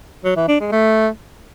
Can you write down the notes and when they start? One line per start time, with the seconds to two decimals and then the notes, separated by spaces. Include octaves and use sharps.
0.24 F#3
0.36 E3
0.48 D4
0.60 G#3
0.72 A3